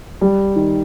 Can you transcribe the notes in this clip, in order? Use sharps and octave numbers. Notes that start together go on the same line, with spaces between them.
G3
D#3